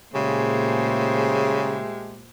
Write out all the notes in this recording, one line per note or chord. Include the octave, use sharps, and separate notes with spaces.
A#2 C#3 G#3 A3 G4 C5